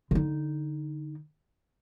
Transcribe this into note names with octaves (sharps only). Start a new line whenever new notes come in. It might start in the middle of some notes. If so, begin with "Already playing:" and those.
D3 D#4